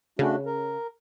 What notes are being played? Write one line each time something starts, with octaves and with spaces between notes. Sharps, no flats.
C#3 A3 D4 F#4
A#4